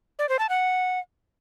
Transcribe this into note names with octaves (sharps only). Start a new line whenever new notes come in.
D5
C5
A5
F#5